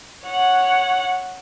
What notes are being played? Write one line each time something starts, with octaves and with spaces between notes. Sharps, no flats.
C#5 F#5